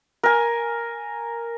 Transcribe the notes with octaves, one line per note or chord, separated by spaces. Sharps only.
A#4 G#5